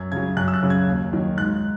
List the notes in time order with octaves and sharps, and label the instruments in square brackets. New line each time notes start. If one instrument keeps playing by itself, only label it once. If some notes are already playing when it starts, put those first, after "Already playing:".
Already playing: [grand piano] F#2 G#6
C#3 F#3 G#6
F#2 F#6
E6
F#6
C#3 F#3
G#6
D#2
D#3 F#3
G#2 F#6